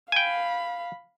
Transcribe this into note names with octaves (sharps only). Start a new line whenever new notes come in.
F5 G5 G#5 B5